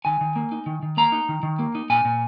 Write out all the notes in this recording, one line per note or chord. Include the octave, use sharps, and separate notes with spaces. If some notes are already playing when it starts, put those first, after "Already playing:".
D#3 G#5
D#3
A#3
D#4
D#3
D#3
A#3 A#5
D#4
D#3
D#3
A#3
D#4
A#2 G#5
A#2